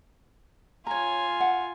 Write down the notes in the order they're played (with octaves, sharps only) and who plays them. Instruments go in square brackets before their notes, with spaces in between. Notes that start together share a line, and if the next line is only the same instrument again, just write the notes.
[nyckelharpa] F4 G#5 [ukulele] C#5 A#5
[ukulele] F#5